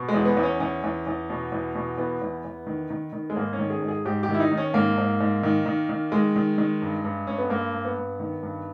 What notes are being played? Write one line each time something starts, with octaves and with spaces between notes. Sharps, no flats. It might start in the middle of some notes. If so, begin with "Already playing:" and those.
Already playing: B2
G#3
E2
B3
E2
C#4
E2 C#4
E2
E2
B2
E2
B2
E2 B3
E2
E2
D#3
D#3
D#3
G#3
G#2 A#3
C#4
D#3
G#4
G#2
G#4
G#2 G4
G4
D#3
E4
D#4
D#3
C#4
G#2 A#3
G#2
G#2
D#3
D#3
D#3
D#3 G#3
D#3
D#3
G2
G2
G2 C#4
B3
G2 A#3
G2
B3
G2
D#3
G2